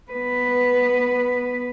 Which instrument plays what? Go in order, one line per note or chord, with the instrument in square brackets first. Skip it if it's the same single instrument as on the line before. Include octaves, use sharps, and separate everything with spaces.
[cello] B3 B4